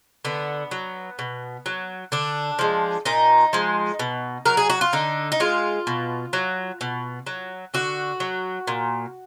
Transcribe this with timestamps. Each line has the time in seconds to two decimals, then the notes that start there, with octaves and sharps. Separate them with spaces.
0.25 D3 B3
0.71 F#3
1.19 B2
1.66 F#3
2.12 D3 D4
2.59 F3 G#3
3.05 A#2 D#4
3.53 F3 G#3
3.99 B2
4.46 F#3 A#4
4.57 G#4
4.70 F#4
4.81 F4
4.93 D3 D#4
5.32 D#4
5.40 G#3 F4
5.87 B2
6.33 F#3
6.81 B2
7.27 F#3
7.74 D3 F#4
8.20 F#3
8.67 A#2